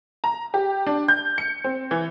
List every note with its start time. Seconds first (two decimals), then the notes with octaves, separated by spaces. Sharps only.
0.24 A#5
0.54 G4
0.87 D4
1.08 G6
1.38 C#7
1.64 C4
1.91 E3